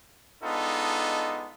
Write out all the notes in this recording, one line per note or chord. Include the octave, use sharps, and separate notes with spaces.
G#3 B3 D4 D#4 F4 A4